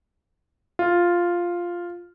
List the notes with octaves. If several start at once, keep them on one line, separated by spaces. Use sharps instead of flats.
F4